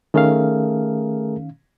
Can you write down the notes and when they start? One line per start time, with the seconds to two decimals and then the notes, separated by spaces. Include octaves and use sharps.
0.14 D#3 A3 C#4 G#4 A#4 F5